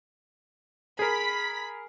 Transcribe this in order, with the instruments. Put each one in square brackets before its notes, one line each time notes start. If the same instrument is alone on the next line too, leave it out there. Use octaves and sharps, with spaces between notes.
[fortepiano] G#4 A#4 [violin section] B5 B6